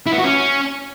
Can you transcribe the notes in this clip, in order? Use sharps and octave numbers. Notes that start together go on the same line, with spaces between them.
E4
B3
F#4
C#4